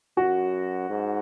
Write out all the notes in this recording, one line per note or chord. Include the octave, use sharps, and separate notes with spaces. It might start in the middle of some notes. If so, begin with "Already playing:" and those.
F#2 F#4
G#2